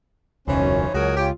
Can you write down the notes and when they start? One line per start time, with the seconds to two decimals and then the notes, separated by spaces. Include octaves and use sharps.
0.48 E1 C#2 F#2 E3 F3 C#4 D#4 C#5
0.94 C#2 F#3 F#4 G#4 A#4
1.17 F4 G4